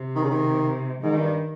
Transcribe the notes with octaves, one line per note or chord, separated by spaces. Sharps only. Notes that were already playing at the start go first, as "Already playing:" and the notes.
Already playing: C3
D#3
C#3
D#3
G#2 D#3
G2